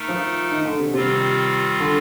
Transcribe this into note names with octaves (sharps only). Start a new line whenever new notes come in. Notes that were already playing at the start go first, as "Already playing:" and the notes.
Already playing: A3 D#4 A#4
F3
D#3
D3
C3
C3 D#3 G3 C4 F4
D3